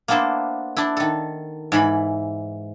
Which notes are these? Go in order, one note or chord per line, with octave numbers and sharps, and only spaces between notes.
A#3 B3 D4 E4 C5
D4 E4
D#3 A4
G#2 E3 B5